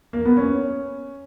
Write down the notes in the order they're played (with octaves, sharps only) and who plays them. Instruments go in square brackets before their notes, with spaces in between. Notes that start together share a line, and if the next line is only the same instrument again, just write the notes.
[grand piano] A#3
B3
C#4